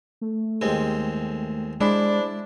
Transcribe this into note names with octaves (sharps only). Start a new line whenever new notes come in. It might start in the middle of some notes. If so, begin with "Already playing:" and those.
A3
D#2 G#3 C4
G#3 D4 E4 C5